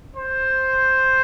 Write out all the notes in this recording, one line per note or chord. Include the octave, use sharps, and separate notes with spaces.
C5